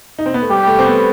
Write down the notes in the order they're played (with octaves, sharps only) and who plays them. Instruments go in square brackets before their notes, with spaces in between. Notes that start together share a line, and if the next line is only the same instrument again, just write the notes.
[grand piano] D#4
C4
B3
A3
[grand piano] G3 [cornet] G4
[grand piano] A3
C4
B3